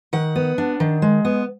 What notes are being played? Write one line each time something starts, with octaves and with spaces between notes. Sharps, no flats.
D#3 F#5
B3
D4
D#3
G#3
B3